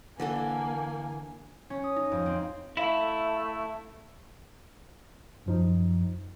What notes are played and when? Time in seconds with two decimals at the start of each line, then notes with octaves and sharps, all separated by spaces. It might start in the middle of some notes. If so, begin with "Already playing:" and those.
0.20 D3 E3 A#3 A4 G#5
1.70 C#4
1.84 D#6
1.96 D#4
2.12 F2
2.26 C4
2.77 A3 E4 E5 F5 B6
5.46 F#2 F3 D#4